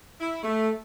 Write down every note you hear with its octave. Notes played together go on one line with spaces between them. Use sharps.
E4
A3